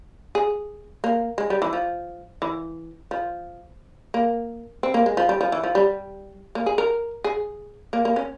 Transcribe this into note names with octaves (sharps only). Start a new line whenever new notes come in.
G#4
A#3
G#3
G3
E3
F3
E3
F3
A#3
C4
A#3
G#3
F3
G3
F3
E3
F3
G3
A#3
G#4
A#4
G#4
A#3
A#3
C#4